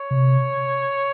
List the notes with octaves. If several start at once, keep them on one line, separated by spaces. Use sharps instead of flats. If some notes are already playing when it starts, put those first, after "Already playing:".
Already playing: C#5
C3